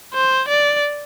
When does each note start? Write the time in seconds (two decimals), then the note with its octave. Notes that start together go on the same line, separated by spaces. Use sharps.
0.14 C5
0.48 D5